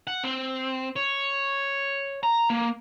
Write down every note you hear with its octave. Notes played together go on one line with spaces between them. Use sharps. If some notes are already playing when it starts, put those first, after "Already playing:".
F#5
C4
C#5
A#5
A#3